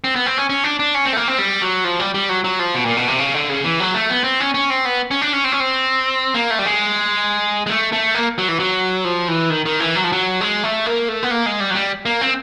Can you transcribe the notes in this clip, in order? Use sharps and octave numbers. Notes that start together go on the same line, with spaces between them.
C4
B3
C4
C#4
C#4
D4
D4
C#4
C4
A3
A#3
C4
G3
F#3
F3
G3
G3
F#3
F#3
F3
B2
A#2
B2
C3
C#3
D3
C#3
E3
F#3
A3
B3
C4
C#4
C#4
C4
B3
C#4
D4
C#4
C4
C#4
C4
A#3
A3
G3
G#3
G#3
A3
A3
A#3
F#3
E3
F#3
F3
E3
D#3
D#3
E3
F#3
F3
F#3
G#3
A3
A#3
A3
B3
A#3
G#3
G3
F#3
G3
A#3
C4